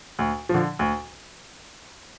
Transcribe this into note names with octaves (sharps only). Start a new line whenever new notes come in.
D2
D3 F3
D2